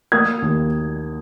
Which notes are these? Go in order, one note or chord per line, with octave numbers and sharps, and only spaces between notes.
A#3 D#6 G#6
D#2